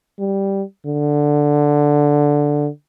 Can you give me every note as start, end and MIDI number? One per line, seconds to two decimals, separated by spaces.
0.19 0.63 55
0.86 2.69 50